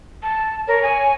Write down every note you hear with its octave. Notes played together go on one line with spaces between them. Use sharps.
A5
A#4 C#5
G#5